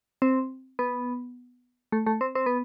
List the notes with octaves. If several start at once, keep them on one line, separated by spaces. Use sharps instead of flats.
C4
B3
A3
A3
C4
C4
B3